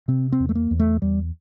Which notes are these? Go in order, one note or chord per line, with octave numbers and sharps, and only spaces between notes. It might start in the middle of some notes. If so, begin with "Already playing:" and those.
C3 C4
C4
E2
A3
A#3
E2
A3
E2 G3